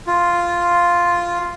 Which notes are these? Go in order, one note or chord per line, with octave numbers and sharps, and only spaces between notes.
F4